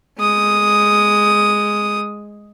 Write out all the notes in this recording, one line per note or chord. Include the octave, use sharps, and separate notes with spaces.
G#3 D#6